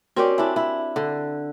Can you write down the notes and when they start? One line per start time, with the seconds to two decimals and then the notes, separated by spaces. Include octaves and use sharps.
0.17 C4 C#4 F#4 G4 A#4 D5
0.38 D4 E4 G#5
0.56 E4
0.96 D3